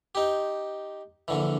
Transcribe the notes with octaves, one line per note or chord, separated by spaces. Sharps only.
D#4 G4
A#1 D3 E3